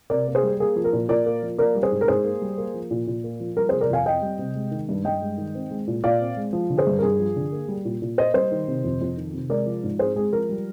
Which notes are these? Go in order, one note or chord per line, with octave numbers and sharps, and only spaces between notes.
C3 A#4 D5
A#3
G#4 C5
G3
A#3 G#4
F3
A#4
A#2
A#2 A#4 D5
A#3
F3
A#3 A#4 D5
G3
G#4 C5
G#2
A#4
G#2 G#4 C5
A#3
G3
A#3
F3
A#2
A#2
A#3
F3
G3 A#4
C3 G#4 C5
A#4 D5
F2 F5 G#5
C4 D#5 G5
G3
C3
G#3
D#3
G2
G2 D#5 G5
G#3
D#3
C4
G#3
A#2
A#2 D5 F5
C4
G#3
F3
D3
G#4 C5
G2
A#4
G2 G#4
F3
D3
A#3
G3
A#2
A#2
A#3 C5 D#5
G3 C5 D#5
D#3
C3
F2
F2
D#3
C3
G#3 A#4 D5
F3
G#2
C4 G#4 C5
G#3 G#4
F3 A#4
G3